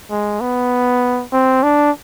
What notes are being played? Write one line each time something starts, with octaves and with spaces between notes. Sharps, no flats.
G#3
B3
C4
D4